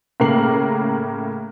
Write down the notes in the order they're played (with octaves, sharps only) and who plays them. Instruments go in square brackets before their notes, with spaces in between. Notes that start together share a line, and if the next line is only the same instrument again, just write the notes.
[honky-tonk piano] A2 C#3 A#3 A#4 C7 F#7